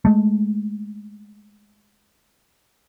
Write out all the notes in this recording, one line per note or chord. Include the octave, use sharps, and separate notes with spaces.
G#3 A3